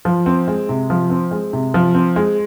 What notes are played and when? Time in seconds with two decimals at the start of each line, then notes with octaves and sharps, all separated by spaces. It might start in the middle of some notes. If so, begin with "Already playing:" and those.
0.05 F3
0.26 C4
0.48 G#3
0.69 C3
0.90 F3
1.10 C4
1.31 G#3
1.53 C3
1.74 F3
1.95 C4
2.16 G#3